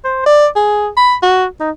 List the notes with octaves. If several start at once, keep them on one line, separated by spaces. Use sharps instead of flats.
C5
D5
G#4
B5
F#4
D#4